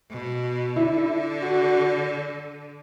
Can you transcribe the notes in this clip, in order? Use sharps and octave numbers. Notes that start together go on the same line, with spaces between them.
B2
D3 E4
E4
F#4